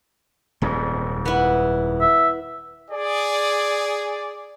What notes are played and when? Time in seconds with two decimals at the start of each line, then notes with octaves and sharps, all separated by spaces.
0.62 D#1 F2 G#2
1.25 B3 E4
2.01 E5
2.90 G#4 D5